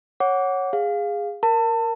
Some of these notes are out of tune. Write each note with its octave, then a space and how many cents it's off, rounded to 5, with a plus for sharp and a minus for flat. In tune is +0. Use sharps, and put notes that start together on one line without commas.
C#5 -10 F#5 +0 D6 -25
G#4 -15 F5 +5
A#4 +0 A5 +30